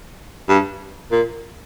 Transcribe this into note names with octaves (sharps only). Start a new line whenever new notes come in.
G2
A#2